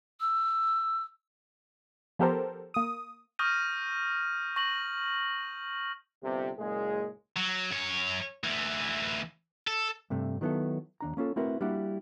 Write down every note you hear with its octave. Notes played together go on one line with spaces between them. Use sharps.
E6
F3 B3 G4 A4 A#4 C5
A#3 D#6
C#6 D#6 F6 G6 A#6 D#7
C#6 A#6 F#7
G1 C3
F#1 A#2 G#3 G#4
F#3
F#2 C#5
D2 E3
A4
G2 C3 A3
D#3 F#3 B3 E4 A4
D#2 D4 A#5
A#3 C#4 F4 A4
A3 C4 E4 F#4 A#4 B4
G3 A#3 D4 E4 F#4